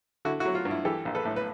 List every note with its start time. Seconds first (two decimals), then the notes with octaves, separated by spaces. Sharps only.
0.25 D3 E4 F#4
0.40 E4 F#4
0.46 F#3
0.55 F4
0.65 G2
0.71 E4
0.85 E3 G4 A4
1.05 A#1
1.15 A4 B4
1.25 A2
1.36 B4